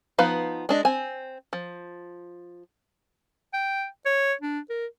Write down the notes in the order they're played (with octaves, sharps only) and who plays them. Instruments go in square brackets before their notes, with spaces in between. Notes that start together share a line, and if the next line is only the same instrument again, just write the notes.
[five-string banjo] F3 B3 D#4 B4 F5
G#3 D4 D#5
C4 G#5
F3
[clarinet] G5
C#5
D4
A#4